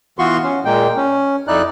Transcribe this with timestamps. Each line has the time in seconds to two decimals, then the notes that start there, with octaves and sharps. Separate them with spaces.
0.19 E3 B3 F4 F#4 C6 C#6
0.43 C#4
0.65 A#2 G#3 A#3 G5
0.97 C#4
1.48 F2 D#4 E4 D5 F#6